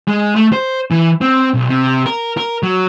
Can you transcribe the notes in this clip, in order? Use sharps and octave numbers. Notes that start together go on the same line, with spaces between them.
G#3
A3
C5
E3
C4
B1
C3
A#4
A#4
F#3